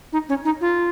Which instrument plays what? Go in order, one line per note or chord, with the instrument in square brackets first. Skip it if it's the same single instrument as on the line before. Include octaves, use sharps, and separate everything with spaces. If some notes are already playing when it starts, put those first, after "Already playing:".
[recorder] D#4
C#4
D#4
F4